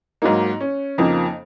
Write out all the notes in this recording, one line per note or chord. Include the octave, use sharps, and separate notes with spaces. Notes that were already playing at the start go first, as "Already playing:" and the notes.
G#2 F#3 A#3 D#4
C#4
F2 C#3 F3 A#3 D#4